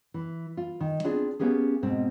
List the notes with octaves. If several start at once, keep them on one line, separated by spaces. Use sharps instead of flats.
E3
F4
D#3
B3 C4 D4 F4 G#4
A#3 B3 C#4 G4 G#4
G#2 B2 C4